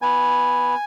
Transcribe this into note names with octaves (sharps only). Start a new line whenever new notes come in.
B3 G#5